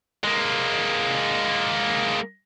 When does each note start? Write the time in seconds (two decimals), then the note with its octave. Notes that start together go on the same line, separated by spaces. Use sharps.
0.24 G#3 A#3